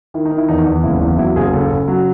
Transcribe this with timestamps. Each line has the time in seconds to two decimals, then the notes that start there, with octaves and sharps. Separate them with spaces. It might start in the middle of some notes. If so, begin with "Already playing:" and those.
0.14 D#3 E4
0.25 D#4
0.31 D#3
0.38 E4
0.48 E2 D#4
0.66 E2
0.83 F#1 E4
1.01 E2 E4
1.18 F#3 E4
1.36 F#1 G#4
1.53 C#3 A4
1.71 C#3
1.88 F#3